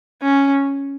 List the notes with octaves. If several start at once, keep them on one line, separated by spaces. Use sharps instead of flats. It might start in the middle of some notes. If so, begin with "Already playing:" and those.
C#4